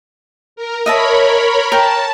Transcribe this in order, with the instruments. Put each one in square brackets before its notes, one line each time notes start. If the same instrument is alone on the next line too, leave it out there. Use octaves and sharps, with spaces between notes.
[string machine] A#4
[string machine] A#4 C#5 B5 [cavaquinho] D#5 E5 A5
[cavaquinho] A#4 G5 [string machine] A5